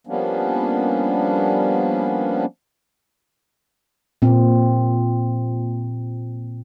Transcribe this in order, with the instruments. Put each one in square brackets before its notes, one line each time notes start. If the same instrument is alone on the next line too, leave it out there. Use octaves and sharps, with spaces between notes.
[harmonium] F3 G3 A#3 B3 C#4 D4
[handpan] A#2 C4